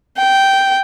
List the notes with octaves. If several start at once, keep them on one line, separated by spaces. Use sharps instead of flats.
G5